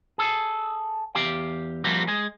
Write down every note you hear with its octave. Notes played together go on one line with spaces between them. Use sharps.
G#4 A4
E2 G4 F5 G5
F3 G3 A#3 C4 F#4 G4
G#3 G#4